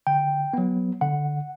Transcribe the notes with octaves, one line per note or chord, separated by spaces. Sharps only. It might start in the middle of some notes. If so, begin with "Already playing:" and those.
D3 G5
F#3 B3
D3 F#5